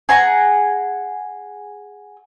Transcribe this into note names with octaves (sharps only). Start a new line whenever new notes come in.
G#4 F#5 A#5